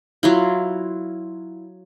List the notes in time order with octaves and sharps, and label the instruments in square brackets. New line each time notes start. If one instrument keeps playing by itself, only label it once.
[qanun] F#3 E4 F4